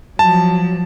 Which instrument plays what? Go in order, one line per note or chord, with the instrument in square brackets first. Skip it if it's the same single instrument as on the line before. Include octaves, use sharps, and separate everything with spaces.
[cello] F3 F#3 [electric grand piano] A5